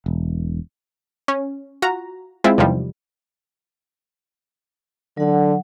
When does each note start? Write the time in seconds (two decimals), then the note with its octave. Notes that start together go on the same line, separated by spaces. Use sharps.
0.06 E1
1.28 C#4
1.82 F4 F#4 A#5
2.44 G#3 C4 E4 F4
2.58 E2 C3 D#3 F3 G3
5.17 D3 F#3 F#5